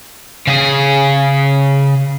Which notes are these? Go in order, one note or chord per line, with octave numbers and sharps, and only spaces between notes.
C#3 G#4